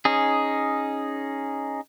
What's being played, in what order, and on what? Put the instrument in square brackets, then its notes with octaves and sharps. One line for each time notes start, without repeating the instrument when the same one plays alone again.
[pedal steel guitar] C#4 D#4 G#4